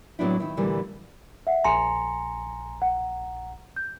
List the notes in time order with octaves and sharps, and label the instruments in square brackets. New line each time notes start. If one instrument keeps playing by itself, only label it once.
[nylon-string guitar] A2 F#3 B3 C4 D4 E4
D#3 E4
A#2 D3 E3 G3 A3
[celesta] E5 F#5
[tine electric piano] A#1 A#5 [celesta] G#5 C6 C#7
[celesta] F#5
G6